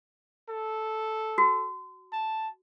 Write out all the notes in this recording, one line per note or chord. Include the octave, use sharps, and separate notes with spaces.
A4
F#4
A5